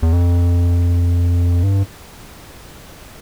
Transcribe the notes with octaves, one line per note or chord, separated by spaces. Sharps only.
E2
F2
G2